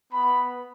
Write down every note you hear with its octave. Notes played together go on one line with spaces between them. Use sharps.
B3 B5